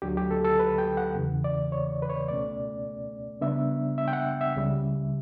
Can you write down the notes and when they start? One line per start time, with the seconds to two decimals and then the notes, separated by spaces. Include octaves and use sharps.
0.02 D2 D3 F#3 G4
0.17 G4
0.31 A4
0.45 A4
0.59 B4
0.78 G5
0.97 F#5
1.15 E2 C#3 E3
1.44 D5
1.72 C#5
2.02 B4
2.10 C#5
2.28 C#2 B2 A3 C#4 D5
3.41 C#3 G3 B3 D4 E5
3.98 E5
4.08 G5
4.13 F#5
4.41 E5
4.56 C#2 C#3 G3